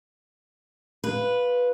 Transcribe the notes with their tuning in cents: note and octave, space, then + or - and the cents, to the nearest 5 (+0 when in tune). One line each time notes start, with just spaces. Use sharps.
F4 +10 B4 -5